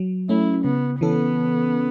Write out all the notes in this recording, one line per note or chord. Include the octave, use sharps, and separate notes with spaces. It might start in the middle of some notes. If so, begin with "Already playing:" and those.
Already playing: F#3
A3 C#4 E4
C#3 B3
E3 B3 C#4 A4